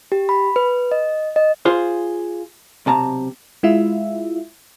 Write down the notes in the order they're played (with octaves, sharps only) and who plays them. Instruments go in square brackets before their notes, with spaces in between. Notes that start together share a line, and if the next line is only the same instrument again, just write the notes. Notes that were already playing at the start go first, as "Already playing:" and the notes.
[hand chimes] G4
B5
B4
D#5
D#5
[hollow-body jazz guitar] F4 G#4 C5
B1 C3 A5 A#5
[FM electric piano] G#3 E4 F4 E5